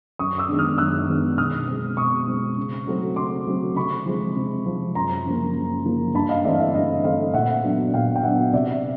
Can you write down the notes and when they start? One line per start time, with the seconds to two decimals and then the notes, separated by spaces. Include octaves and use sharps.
0.19 F#2 C#6 D#6
0.38 D6 E6
0.49 D#3 G#3 B3 D4
0.59 D#6 F6
0.78 F#2 E6 F#6
1.08 D#3 G#3 B3 D4
1.38 B2 D#6 F6
1.68 G#3 C4
1.97 B2 C#6 D#6
2.27 G#3 C4
2.57 C#3
2.87 F#3 A3 C4
3.16 C#3 C6 D6
3.47 F#3 A3 C4
3.76 C3 B5 C#6
4.06 F3 G#3 C4
4.36 C3
4.65 F3 G#3 C4
4.95 F#2 A#5 C6
5.26 C#3 F3 A#3
5.55 F#2
5.85 C#3 F3 A#3
6.14 G2 A5 B5
6.29 D#5 F5
6.44 E3 A3 C4 D5 E5
6.55 F5
6.60 D5 E5
6.74 G2 D#5 F5
7.04 E3 A3 C4 D#5 F5
7.34 A#2 E5 F#5
7.63 F#3 B3 D4
7.94 A#2 F5 G5
8.16 G5
8.23 F#3 B3 D4 E5 F#5
8.53 C3 D5 E5